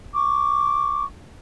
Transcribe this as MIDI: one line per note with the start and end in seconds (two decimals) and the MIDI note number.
0.14 1.04 85
0.14 1.04 86